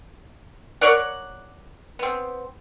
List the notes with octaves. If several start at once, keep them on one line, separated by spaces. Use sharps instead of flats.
A#4 C#5 D5 F#5
B3 C4